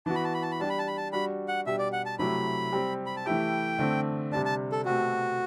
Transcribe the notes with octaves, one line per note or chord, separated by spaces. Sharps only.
E3 B3 F#4 A5
B5
A5
B5
A5
B5
G3 D4 G4 A5
B5
A5
B5
A5
G3 D4 F#4 B5
F#5
B2 G3 D4 G4 E5
D5
F#5
A5
C3 F#3 A3 E4 G4 B5
G3 C4 G4
B5
A5
E3 A3 E4 G4 G5
D3 A3 C4
C3 G3 D4 A5
A5
A4
B2 A3 C4 F#4 G4